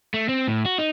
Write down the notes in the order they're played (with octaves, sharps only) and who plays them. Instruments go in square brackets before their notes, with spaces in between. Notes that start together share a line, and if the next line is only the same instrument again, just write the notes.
[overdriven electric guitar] A3
C4
A2
F#4
D#4